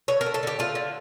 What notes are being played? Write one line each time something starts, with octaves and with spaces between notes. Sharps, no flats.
D3 C#5
A#4
A3
A4
D3 G4
A3 F4
D3